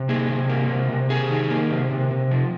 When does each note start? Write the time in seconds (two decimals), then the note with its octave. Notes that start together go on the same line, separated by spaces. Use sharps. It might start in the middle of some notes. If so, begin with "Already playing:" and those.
Already playing: C3
0.09 A#3 G#4
0.29 C3
0.49 A#3
0.70 C3
0.90 C3
1.10 C3 G#4
1.30 D#3
1.50 A#3
1.70 C3
1.91 C3
2.11 C3
2.31 F3